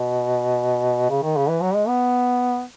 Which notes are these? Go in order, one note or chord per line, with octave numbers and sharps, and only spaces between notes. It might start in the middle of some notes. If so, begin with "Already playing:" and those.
Already playing: B2
C#3
D#3
C#3
E3
F#3
G#3
B3